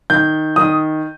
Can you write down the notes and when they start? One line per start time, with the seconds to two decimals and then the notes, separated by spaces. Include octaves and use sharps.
0.10 D#3 G6
0.56 D#3 D#6